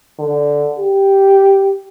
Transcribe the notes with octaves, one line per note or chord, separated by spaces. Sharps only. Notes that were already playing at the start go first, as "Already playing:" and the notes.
D3
G4